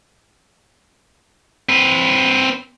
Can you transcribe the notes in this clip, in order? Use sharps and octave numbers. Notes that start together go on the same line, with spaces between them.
C4 B4